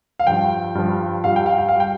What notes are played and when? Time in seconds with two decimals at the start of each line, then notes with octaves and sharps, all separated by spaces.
0.19 F5
0.27 G2 F3 G5
0.75 G2 F3
1.24 G2 G3 F5
1.36 G5
1.46 F5
1.58 G5
1.68 F5
1.76 G3 G5